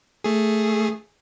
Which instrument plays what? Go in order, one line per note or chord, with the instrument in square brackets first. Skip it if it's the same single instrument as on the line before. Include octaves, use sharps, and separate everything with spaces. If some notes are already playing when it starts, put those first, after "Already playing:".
[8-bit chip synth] A3 G#4